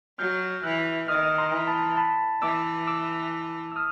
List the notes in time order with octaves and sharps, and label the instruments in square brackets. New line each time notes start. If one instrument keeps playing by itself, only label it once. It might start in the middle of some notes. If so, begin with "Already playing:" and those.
[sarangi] F#3 [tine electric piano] F6 G6
[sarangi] E3 [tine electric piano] E6 F#6
[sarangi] D#3 [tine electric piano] D#6 F6
[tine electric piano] A#5 C6
[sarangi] E3
[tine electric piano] A5 B5
A5 B5
[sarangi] E3 [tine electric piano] D6 E6
[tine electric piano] D6 E6
E6
D#6 F6